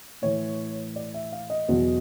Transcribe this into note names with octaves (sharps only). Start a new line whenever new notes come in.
A2 E3 C#5
D5
E5
F5
D#5
E2 B2 F#3